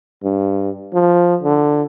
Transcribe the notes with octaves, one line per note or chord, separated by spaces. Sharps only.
G2
F3
D3